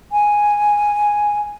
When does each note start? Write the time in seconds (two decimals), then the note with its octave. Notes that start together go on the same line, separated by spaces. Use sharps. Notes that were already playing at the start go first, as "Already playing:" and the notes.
0.12 G#5